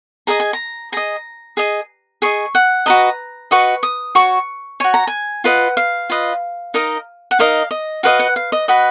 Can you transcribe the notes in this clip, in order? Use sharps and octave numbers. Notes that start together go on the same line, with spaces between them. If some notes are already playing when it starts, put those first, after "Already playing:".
G#4 D#5 A#5
G#5
A#5
G#4 D#5 A#5
G#4 D#5
G#4 D#5 C#6
F#5
F#4 B4 D#5 A#5
F#4 B4 D#5 C#6
D#6
F#4 C#5 C#6
F#4 C#5 G#5
A#5
G#5
F4 B4 D#5 F#5
F5
F4 B4 D#5
D#4 A#4 D#5
F#5
D#4 A#4 D#5 F5
D#5
F#4 B4 D#5 F5
F#5
F5
D#5
F#4 B4 D#5 B5